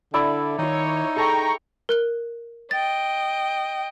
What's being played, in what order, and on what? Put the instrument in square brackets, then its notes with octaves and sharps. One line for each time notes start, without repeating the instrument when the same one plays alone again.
[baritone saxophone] D3 [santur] E4 D5 E5
[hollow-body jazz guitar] D#3 F4 [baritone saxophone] D#4 [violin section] C#5
[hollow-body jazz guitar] G#4 A4 A5 [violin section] G5 A#5 C#6
[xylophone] A#4 F#6 G7
[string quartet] D#5 G5 [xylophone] A6